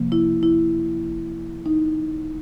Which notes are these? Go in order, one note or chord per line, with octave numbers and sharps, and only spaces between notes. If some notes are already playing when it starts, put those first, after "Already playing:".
Already playing: C3 F3 A#3
E4
E4
D#4